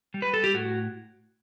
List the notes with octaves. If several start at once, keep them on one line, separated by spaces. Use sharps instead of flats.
G3
B4
A4
G4
A2 F#4